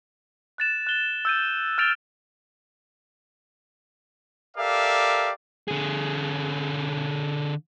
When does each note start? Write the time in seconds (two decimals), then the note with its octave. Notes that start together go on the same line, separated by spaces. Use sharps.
0.58 F#6 A6 E7
0.87 F#6 G7
1.25 E6 G6 D#7
1.78 F6 G6 A6 D7 F7
4.57 G4 A4 A#4 D5 E5 F5
5.68 D3 G#4